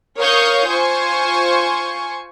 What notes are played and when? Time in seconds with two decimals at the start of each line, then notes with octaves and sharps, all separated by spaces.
0.18 A#4 C#5 F5 C#6 D#6 G6
0.69 F4 C5 G#5 C#6